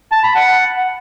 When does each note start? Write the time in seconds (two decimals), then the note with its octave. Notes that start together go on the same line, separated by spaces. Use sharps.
0.12 A5
0.23 B5
0.35 F#5